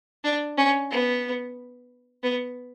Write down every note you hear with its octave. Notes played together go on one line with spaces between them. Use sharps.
D4
C#4
B3
B3